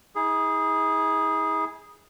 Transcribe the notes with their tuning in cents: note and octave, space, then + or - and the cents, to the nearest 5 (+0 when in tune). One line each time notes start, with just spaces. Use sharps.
E4 -45 G#4 -5